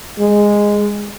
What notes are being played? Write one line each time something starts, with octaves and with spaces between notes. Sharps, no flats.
G#3